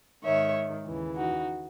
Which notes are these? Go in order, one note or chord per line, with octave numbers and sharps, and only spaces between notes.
G#2 D#3 C#5 E5
D#2 C#3 E3
D#4 F#4